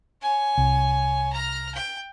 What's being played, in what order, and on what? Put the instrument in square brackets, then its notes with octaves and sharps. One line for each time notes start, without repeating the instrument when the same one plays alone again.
[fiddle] C#5 G#5
[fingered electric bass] C2
[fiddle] A#5 F6
G5